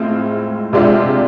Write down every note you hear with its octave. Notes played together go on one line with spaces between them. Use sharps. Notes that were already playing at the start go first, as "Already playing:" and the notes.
Already playing: A2 G#3 C4 F4
C3 G#3 D4 F4